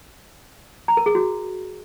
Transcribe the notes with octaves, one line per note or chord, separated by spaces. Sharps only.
A#5
A#4
G#4
F#4